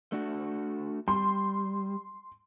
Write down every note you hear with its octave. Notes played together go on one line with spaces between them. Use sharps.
A3 D4 F#4
G3 C6